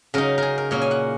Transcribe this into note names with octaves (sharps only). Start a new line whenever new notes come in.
C#3 F#3 D#4 A#4
G#4 A#4
A#4
A#2 A#3 C#4 C#5
G#5
F#5